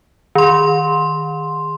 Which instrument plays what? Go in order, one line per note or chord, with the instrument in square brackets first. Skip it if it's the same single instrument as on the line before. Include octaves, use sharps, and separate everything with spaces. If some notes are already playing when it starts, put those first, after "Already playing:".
[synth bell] D#3 C6